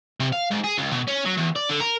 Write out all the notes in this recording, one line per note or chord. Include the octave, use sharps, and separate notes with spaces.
C3
F5
G#2
G#4
C#2
B2
C#4
F#3
E2
D5
D3
A#4